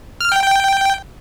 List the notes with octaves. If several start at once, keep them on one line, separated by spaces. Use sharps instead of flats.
F6
G5
G5